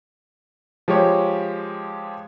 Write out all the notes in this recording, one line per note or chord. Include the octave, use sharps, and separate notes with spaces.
F3 G#3 G4 C#5